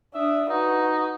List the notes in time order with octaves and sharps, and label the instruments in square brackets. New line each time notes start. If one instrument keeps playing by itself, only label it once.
[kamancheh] D4 D#6 [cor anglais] E5
[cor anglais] D#4 [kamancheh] F#4 B4